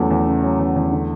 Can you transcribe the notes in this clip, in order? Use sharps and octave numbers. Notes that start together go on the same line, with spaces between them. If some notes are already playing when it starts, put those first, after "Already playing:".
Already playing: E2 C#3 F#3 A3
E2
C#3
F#3
E2
E2
D3